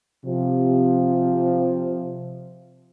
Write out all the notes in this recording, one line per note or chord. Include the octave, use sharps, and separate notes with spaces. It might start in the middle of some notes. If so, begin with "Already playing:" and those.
C3 F3